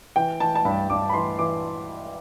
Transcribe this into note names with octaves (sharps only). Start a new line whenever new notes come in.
E3 G5
E3 A5
A5
G2 B5
G2 D6
B5
E3 C6
E3 D6